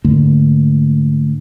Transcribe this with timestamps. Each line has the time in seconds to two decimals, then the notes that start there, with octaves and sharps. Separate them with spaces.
0.04 G#2 D3 A3 A#3